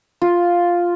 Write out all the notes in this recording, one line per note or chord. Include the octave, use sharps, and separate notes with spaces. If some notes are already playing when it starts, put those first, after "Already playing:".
F4